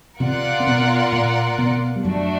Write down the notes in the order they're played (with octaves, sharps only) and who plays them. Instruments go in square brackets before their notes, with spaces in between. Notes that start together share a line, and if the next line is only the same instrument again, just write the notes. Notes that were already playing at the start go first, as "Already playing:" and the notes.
[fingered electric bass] C3 C4 [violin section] F4 A#4 D5 F#5
[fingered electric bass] C4
B2 B3
A#2 A#3
B2 B3
G3
[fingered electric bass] F#2 F#3 [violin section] A3 D4 F#4